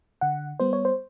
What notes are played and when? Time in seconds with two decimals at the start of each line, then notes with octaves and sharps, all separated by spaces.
0.21 D3 F#5
0.60 G3 B3 C5
0.73 C#5
0.85 C5